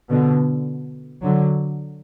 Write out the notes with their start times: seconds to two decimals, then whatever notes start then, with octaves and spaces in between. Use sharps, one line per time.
0.10 B2 D3
1.22 D3 F#3